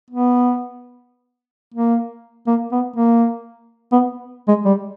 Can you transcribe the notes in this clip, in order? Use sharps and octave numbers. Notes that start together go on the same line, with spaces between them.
B3
A#3
A#3
B3
A#3
B3
G#3
G3